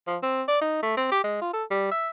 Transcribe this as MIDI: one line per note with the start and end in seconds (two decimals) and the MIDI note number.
0.07 0.17 53
0.23 0.42 60
0.48 0.61 74
0.61 0.78 63
0.83 0.96 57
0.97 1.06 60
1.12 1.19 67
1.24 1.37 56
1.41 1.51 65
1.53 1.64 69
1.70 1.90 55
1.91 2.09 76